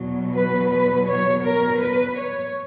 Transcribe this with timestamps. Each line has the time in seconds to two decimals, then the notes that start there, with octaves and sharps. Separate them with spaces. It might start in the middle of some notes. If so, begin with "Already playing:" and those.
Already playing: E2 B2 F#3
0.35 B4
0.72 B4
1.08 C#5
1.45 A#4
1.82 B4
2.18 C#5